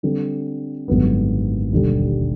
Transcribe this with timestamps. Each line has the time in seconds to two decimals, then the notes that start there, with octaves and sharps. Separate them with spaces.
0.03 D3 G3 C4
0.88 G#1 F#2 D3 G3 B3
1.71 E1 D#2 D3 G3